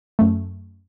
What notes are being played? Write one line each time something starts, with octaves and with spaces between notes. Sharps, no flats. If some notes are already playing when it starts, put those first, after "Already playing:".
F#2 A3